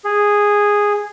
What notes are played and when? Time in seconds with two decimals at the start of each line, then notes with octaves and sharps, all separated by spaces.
0.04 G#4